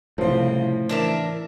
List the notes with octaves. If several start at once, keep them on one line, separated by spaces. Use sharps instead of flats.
C2 A2 C#3 F3 C4
E3 D4 A#4 E5